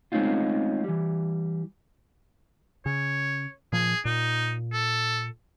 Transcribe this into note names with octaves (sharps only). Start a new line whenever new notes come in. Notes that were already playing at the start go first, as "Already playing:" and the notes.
G#3 A3 C4 C#4 D#4 F4
E3 G3
C#3 C#5
A#2 F3 G#4
A#2 D#4
A4